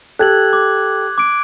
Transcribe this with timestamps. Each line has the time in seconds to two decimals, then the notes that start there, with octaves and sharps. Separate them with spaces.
0.19 G4 A4 F#6 G#6 F#7
0.53 D6
1.18 D6 D7